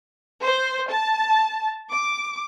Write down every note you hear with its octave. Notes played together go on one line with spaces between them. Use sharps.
C5
A5
D6